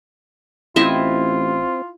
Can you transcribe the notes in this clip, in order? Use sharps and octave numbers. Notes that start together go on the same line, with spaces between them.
A1 C4 E4 F4 D#5 E5